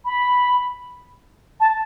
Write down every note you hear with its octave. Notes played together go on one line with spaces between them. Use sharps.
B5
A5